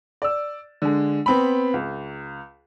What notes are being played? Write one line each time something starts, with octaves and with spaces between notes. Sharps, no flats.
D5 E6
D3 G#3
B3 C4 B5
C#2